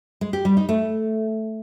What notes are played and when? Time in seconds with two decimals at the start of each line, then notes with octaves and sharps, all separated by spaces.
0.21 G#3
0.33 G4
0.45 G3
0.57 D#4
0.69 A3